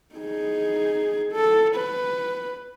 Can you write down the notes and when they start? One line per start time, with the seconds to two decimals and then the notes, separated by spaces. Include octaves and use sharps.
0.15 D#4 G#4
1.32 A4
1.76 B4